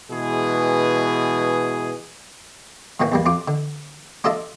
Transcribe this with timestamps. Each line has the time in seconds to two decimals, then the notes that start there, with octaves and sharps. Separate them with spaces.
0.10 B2 E3 G#3 G#4
3.00 A2 D#3 E3 A#3 C#4
3.12 E2 G3 A#3
3.26 F2 F4 D6
3.48 D3
4.24 D4 F4 A4 D#5 E5 A5